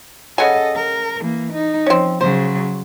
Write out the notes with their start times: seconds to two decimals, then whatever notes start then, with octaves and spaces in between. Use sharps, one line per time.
0.38 C#3 A4 D#5 F#5 G#5
0.75 A#4
1.21 E3 A#3
1.53 D#4
1.86 F3 C4 C#4
2.21 C#3 F#3 C5